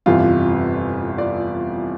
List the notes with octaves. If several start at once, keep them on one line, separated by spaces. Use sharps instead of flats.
G1 F2 C3 E3 G3 F4
D5